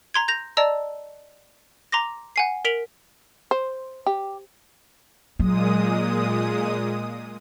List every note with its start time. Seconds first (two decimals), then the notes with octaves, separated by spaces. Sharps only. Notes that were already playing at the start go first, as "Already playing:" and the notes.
0.14 A#5 C6 G#6
0.28 G6 A#6 F7
0.57 D5 D#5 A5 A#5 E6
1.92 A#5 C6 D6 A#6
2.36 F#5 G#5 C7
2.65 A#4 B6 D7 F7 F#7
3.51 C5
4.06 G4
5.39 A#2 F#3 G#3 D#6